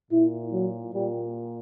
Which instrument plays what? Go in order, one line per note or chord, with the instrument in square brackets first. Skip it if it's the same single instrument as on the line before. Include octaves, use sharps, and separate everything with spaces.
[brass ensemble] A#2 E4
F#3
A#2 G3